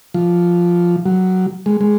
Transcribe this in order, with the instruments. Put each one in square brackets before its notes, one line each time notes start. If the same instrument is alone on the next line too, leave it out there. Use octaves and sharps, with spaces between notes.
[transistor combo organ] F3
F#3
G#3
G#3